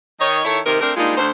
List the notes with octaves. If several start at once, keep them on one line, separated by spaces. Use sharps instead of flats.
D#3 C#5 D#5
D#3 E4 A4 C#5
C3 D#3 A#4
A3 C4 D4 A#4
G3 G#3 A#3 D4 D#4 F4
D2 C5